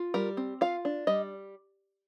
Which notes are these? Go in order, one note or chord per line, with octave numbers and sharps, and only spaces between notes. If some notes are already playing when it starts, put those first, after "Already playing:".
Already playing: F4
G3 A#4
C4
F4 F5
D4
G3 D#5